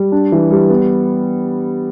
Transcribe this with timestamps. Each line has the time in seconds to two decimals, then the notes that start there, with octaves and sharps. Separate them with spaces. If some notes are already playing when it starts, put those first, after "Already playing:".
Already playing: G3
0.12 D4
0.32 E3
0.51 G3
0.70 B3